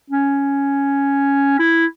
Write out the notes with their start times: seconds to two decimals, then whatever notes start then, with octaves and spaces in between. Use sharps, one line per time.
0.10 C#4
1.59 E4